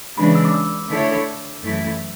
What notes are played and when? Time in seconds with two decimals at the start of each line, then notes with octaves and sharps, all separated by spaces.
0.17 C#3 E3 G#3 D4 B5
0.35 E6
0.45 D6
0.54 E6
0.90 D3 A3 E4 A4 C#5
1.62 F#2 E3 A3 E4